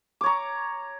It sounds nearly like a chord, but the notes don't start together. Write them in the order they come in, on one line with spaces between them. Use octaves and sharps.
D6 C#5 A#5